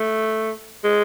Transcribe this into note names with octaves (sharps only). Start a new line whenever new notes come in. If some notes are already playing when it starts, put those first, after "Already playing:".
Already playing: A3
G#3